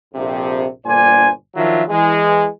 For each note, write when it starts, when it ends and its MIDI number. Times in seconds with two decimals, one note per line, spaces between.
0.15 0.65 34
0.15 0.65 41
0.15 0.65 48
0.83 1.28 31
0.83 1.28 46
0.83 1.28 50
0.83 1.28 72
0.83 1.28 74
0.83 1.28 80
1.55 1.83 51
1.55 1.83 53
1.55 1.83 54
1.55 1.83 62
1.55 1.83 65
1.55 1.83 76
1.88 2.45 52
1.88 2.45 56